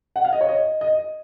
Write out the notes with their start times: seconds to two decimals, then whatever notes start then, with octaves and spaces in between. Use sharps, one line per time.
0.16 F#5
0.25 F5
0.33 D#5
0.41 C#5
0.49 D#5
0.81 D#5